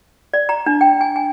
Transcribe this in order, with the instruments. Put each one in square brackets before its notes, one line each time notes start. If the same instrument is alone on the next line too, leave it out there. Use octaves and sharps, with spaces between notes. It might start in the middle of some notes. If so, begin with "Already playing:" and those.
[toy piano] D5
A#5
D4
G5
G#5
G#5